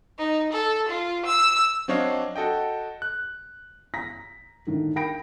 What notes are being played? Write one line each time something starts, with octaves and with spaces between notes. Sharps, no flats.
D#4
A4
F4
E6
F#3 C4 D4 C#5 D#5 F5
F#4 A4 D#5 G5
F#6
A#5 A#6 B6
A2 D3 D#3
A#4 G5 B5 A#6 D7